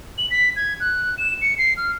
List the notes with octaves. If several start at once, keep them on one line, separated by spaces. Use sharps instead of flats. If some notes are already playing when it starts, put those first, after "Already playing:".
F#7
B6
G#6
F#6
E7
C#7
C7
F6